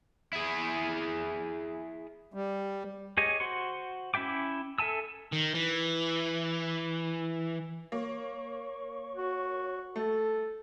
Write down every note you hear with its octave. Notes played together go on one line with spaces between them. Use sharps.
E4 G#4
G3
G4 G#4 C#5 D#5
F#4 C5 C6 C#6
C#4 E4 E5 G5 D6
A4 E5 G#5 A5 E6
D#3
E3
A#3 C#5 C#6
F#4
A3 A4